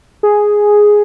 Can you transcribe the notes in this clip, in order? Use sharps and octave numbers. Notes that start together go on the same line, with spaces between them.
G#4